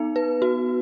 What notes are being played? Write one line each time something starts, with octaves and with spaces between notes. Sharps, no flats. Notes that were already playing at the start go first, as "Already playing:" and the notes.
Already playing: B3 D#4
B4
F#4